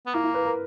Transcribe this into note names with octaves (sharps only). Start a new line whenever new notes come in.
B3
A#3 E4
E4
B4
A#4